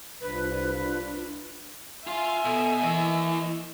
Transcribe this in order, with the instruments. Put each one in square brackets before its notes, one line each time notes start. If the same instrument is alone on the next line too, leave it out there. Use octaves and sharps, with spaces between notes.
[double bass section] C2 [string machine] D4 F4 [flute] B4
[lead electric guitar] F4 F5 [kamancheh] E5 G#5
[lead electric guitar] B2 [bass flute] A4
[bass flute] E3 [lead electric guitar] A#3 D#5